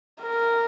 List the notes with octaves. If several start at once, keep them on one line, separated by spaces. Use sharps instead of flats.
A#4